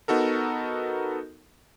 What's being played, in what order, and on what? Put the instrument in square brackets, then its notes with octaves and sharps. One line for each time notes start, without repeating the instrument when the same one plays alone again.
[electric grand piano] B3 D#4 F#4 A4 A#4